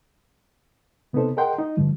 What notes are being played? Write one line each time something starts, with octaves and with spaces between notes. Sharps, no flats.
C3 B3 C4 D#4 A4 C5
G#4 A#4 D#5 F#5 G5 C6
D#4
G2 D3 F3 G3